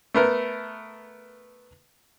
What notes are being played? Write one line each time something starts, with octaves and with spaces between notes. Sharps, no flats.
A3 B3 A#4